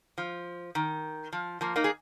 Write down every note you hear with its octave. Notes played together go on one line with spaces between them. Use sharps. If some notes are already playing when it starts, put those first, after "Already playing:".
F3
D#3
F3
F3 A#3
A#3 D#4
G#4